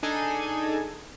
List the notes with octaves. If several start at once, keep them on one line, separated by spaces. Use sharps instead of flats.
D4 D#4 G#4 A4 G#5